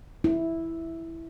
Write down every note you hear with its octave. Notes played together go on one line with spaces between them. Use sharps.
E4